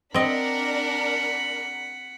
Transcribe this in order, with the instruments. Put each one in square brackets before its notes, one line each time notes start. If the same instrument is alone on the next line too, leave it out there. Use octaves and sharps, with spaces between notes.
[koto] C4 D#5 [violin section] D4 A#4 [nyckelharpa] F#5 B5